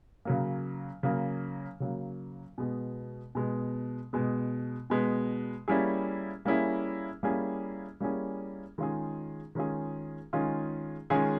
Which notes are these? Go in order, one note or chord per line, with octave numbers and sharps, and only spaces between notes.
C#3 F#3 A#3
C#3 F#3 A#3
C#3 F#3 A#3
B2 G#3 B3
B2 G#3 B3
B2 G#3 B3
B2 G#3 B3
G3 A#3 C#4 E4 G#4
G3 A#3 C#4 E4 G#4
G3 A#3 C#4 E4 G#4
G3 A#3 C#4 E4 G#4
D#3 G#3 C#4 F4 G#4
D#3 G#3 C#4 F4 G#4
D#3 G#3 C#4 F4 G#4
D#3 G#3 C#4 F4 G#4